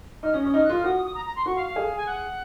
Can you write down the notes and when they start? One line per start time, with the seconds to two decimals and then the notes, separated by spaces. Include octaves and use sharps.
0.23 D#4 F6
0.33 C#4 D#6
0.44 C#4 D#6
0.54 D#4 F6
0.64 F#6
0.69 F4
0.75 F6
0.84 F#4 D#6
0.95 D#6
1.05 D#6
1.14 A#5
1.25 A#5
1.36 C6
1.46 F#4 C#6
1.56 F5
1.67 F5
1.76 G#4
1.97 G#5
2.06 F#5